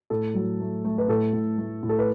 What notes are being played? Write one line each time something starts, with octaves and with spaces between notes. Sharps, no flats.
A2 A4
F#3
A3
A3
B4
A2 A4
A2
A3
A2
A4
B4